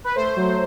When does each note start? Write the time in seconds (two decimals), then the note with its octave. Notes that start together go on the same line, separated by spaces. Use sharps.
0.04 B4
0.16 A3 C5
0.36 F#3